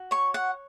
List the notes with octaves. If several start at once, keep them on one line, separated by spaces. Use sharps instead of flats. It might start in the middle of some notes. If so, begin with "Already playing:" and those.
Already playing: F#4
C#5 C#6
F#5